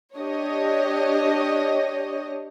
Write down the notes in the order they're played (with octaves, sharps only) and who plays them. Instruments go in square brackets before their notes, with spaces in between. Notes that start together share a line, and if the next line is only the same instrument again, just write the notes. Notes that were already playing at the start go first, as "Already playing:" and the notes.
[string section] D4 G4 C#5 D#5